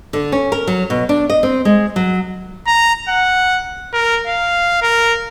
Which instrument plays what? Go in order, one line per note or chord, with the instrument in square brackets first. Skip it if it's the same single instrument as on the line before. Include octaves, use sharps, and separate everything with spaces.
[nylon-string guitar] D3
C#4
A#4
F#3
B2
D4
D#5
C4
G#3
F#3
[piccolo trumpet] A#5
F#5
A#4
F5
A#4